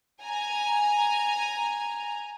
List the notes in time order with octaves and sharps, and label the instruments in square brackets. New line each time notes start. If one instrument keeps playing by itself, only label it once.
[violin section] G#5 A#5